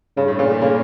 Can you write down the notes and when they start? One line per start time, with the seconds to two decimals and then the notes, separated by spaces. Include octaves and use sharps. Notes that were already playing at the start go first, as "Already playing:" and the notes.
0.17 G2 C#3
0.28 A2
0.39 A#2 C#3
0.50 A3
0.62 C#3 A#3